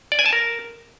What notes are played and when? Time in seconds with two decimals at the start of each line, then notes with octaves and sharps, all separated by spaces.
0.12 D5
0.19 G#5
0.26 A5
0.33 A#4